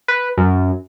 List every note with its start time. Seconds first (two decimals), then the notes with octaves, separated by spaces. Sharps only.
0.08 B4
0.38 F#2